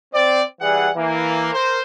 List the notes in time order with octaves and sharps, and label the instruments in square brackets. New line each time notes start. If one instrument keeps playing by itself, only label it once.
[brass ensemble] C4 D5
E3 G3 G#4 D5 F#5
E3 A#3
A#4 C5